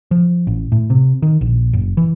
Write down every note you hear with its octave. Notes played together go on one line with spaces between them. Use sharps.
F3
A1
A2
C3
D#3
A#1
F#1
E3